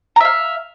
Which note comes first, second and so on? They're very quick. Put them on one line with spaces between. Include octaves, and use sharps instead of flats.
A#5 E5 F5